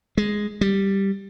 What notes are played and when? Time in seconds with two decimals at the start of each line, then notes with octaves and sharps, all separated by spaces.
0.17 G#3
0.61 G3